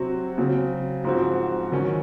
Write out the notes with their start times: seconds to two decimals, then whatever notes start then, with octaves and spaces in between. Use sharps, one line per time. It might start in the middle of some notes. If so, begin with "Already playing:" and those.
Already playing: C3 F#3 C4 F#4
0.38 C#3 F#3 C4
1.04 G#2 F3 C4 F#4
1.71 D#3 F#3 C#4